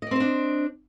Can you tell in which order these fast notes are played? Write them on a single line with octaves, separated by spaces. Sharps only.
D#5 D5 C4 C5 D4